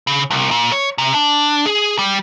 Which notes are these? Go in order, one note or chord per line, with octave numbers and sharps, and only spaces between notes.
C#3
C2
A#2
C#5
C3
D4
G#4
G3